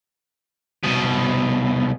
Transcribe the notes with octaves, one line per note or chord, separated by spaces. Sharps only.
C2 B2